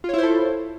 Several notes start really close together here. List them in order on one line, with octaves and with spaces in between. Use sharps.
F4 C#5 E4 C5 A4